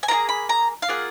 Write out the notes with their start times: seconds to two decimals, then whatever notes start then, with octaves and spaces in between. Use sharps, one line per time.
0.03 G#5
0.08 A#3 F4 G#4 A#5
0.29 B5
0.49 A#5
0.82 F5
0.88 A#3 F4 G#4 F#5